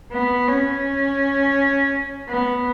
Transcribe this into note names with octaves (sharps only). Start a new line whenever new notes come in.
B3
C#4
B3